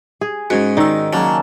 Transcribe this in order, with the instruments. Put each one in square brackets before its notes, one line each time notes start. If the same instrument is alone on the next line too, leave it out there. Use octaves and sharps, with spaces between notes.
[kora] G#4
[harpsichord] G#2 [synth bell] G#3 C#4 F#4
[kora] D#3 D#4 [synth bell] D5 E6
[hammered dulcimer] C#3 A#3 A5 [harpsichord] F#3